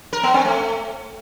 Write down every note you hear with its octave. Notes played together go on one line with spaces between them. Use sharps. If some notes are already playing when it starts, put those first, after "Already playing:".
A#4
B3
C4
A3